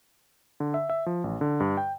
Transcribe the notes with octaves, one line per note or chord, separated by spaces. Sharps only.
D3
E5
E5
F3
A1
D3
G2
G5